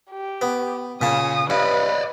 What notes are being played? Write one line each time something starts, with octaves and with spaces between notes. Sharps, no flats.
G4
B3
A#2 C#3 A5 D#6
G2 B4 D5 D#5